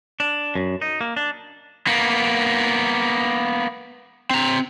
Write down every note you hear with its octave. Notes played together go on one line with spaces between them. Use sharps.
D4
F#2
D#4
A#3
D4
A#3 B3
C4 A#5